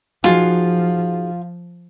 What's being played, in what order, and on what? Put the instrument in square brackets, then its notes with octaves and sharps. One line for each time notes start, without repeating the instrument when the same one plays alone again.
[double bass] F3 [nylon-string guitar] D#4 F#4 G#4 [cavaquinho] F4